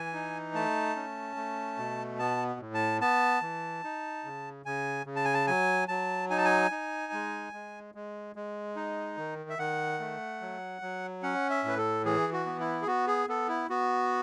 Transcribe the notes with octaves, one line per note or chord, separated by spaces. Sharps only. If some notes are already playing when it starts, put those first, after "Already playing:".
Already playing: E3 G#5
D#4
A3 A5
C#4
A3
B2
B3 A5
A2
A5
B3 A5
E3
D#4
C#3
C#3 G#5
C#3
A5
G#5
A5
F#3 G#5
F#3 A5
D#4 G#5
A5
G#5
D#4
G#3
G#3
G#3
G#3
D#4
D#3
E5
D#3 F#5
A3
F#3
F#3
C#4 F#5
E5
A2 B4
A4
E3 G#4
F#4
B3
E4
G#4
B3 F#4
G#4
B3 A4
E4
B3 F#4